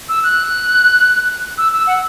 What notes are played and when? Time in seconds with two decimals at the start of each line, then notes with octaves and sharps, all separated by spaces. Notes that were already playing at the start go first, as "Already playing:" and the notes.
0.09 E6
0.24 F#6
1.58 E6
1.73 E6
1.87 F#5